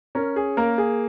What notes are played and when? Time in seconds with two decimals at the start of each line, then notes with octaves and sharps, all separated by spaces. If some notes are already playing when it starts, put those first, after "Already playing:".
0.15 C#4 A#4
0.36 G#4
0.57 A#3 A#4
0.78 G#4